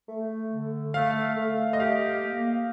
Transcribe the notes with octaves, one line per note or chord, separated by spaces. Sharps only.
A3
D3
A3 F5
A3
D#5
G4 F5
A#3